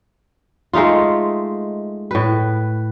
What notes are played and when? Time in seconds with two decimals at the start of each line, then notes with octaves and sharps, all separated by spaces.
0.73 G#3 A3 D#4 F4
2.11 A2 B4